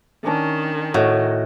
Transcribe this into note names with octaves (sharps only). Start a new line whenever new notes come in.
D#3 C#4 D4 A#5
A2 F#4 C#5 D#5